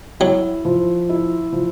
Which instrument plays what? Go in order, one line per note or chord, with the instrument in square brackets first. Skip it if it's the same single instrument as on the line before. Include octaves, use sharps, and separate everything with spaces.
[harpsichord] F#3 [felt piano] E4
[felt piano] F3
E4
F3